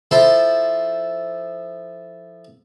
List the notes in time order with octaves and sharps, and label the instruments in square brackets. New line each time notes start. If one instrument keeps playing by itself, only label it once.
[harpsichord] F3 E4 A4 C5 C6